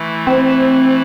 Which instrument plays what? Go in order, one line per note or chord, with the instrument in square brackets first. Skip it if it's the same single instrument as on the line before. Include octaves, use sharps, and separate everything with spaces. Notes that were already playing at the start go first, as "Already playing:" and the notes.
Already playing: [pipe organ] E3 A3 E4
[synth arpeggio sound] C4